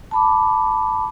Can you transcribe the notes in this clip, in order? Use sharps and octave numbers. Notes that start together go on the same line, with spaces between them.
A5 B5 D6